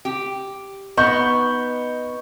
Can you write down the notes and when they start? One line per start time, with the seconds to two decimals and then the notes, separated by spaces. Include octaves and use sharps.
0.05 G4
0.97 B3 D#4 D#5 C#6 G6